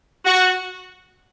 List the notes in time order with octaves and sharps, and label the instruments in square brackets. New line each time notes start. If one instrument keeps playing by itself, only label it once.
[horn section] F#4